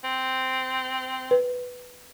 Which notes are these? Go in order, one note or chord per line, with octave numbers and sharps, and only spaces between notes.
C4
B4